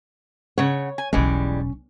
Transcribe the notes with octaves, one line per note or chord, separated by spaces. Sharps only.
C#3 C#5 F#5
G#5
E1 B1 E3 G3 G#3 C#4